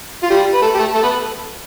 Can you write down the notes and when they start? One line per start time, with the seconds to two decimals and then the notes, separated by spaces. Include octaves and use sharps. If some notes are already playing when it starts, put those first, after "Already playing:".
0.23 F4
0.30 G3 G4
0.54 B4
0.62 A3 A4
0.75 G4
0.79 A3 A4
0.95 A3 A4
1.03 B3 B4